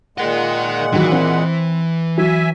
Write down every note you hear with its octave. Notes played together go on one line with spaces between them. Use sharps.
A#2 G#3 A#4 D#5 F#5
D#3 E3 F#3
C4
F#3 E5 G#5